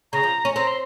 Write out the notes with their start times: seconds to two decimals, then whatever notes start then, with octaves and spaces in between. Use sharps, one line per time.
0.13 C#3 A#5
0.23 F3
0.45 C#4
0.55 C4 A#5
0.67 C6